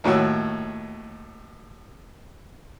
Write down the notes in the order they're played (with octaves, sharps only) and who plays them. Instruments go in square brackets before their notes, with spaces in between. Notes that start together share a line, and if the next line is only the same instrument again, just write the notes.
[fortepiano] D#2 A2 F#4 C#5 E6